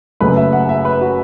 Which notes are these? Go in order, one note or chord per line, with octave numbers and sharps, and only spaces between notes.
F#1 F#2 F#3 A3 B4
E5
F#5
E5
B4
F#4